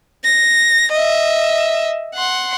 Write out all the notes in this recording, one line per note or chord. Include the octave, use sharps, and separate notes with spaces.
A#6
D#5 E5
F#5 C6